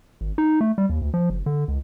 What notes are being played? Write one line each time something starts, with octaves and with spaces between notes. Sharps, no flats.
G#1
D#4
A3
G3
D#2
D2
F3
F#1
D3
C#2